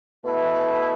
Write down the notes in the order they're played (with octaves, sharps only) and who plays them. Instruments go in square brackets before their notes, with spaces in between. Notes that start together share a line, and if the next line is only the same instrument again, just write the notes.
[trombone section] B2 A3 E4 [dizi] B4